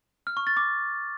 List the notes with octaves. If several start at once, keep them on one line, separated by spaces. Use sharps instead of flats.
F6
C#6
A6
D6